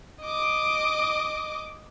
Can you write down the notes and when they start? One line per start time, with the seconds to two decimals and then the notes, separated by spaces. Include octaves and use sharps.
0.23 D#5 D6